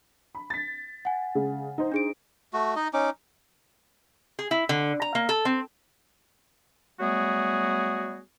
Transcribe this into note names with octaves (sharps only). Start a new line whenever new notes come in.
B5
A6 B6
F#5 G#5
C#3 G#3
D#4 C5
D4 G#4 D7
A3 F#4
D#4 D#5
C#4 D#4 D6
G#4
E4
D3
A#5
A#3
A4
C4
F#3 G3 A3 B3 F#4 G#4